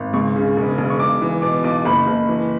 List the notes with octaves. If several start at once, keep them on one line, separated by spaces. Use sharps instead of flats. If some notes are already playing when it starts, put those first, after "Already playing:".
Already playing: G#1
C#2 C#6
C#3
E1
E1
C#6
B1 D6
E3
B2 D6
B1 D6
F#1 B5
F#1
E3